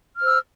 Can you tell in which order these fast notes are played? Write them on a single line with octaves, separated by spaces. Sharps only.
F6 C5 E6